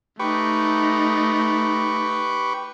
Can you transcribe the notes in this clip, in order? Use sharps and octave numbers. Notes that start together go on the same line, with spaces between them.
A3 D#4 G4 B4 C#6